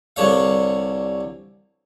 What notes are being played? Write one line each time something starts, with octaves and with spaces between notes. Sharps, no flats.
C2 D3 C#4 F5